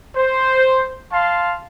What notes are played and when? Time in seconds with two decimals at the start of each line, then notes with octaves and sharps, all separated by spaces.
0.16 C5
1.13 F5 A5 C6